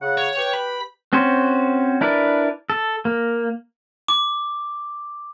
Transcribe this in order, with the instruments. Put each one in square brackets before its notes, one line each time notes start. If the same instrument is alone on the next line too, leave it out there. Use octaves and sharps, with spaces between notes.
[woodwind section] C#3 F#5
[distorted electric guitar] C#5
[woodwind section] G4 B4 G5
[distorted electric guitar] B5
[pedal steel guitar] C4 C#4 F#4 C5
D4 E4 A#4 B4 D5
A4
A#3
[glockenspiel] D6